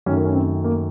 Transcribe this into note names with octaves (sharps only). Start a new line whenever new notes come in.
F#2 D#3 A3 C#4
A#4
C#4
C4
A#3